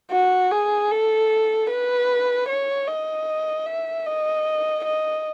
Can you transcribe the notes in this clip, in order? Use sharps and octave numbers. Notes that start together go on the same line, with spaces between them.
F#4
G#4
A4
B4
C#5
D#5
E5
D#5
D#5